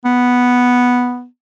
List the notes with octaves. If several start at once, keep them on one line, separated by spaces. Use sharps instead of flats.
B3